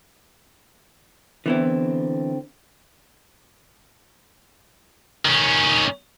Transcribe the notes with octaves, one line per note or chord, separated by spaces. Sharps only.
D3 E3 B3 C4 E4
D#3 C#4